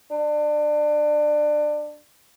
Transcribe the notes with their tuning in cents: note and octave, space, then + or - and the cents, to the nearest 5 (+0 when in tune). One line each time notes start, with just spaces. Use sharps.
D4 +25